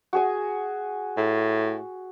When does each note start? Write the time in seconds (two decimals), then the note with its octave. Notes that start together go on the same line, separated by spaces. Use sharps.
0.13 F#4 G#4 G#5
1.17 A2